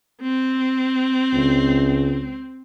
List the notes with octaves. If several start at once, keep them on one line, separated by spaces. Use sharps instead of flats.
C4
C#2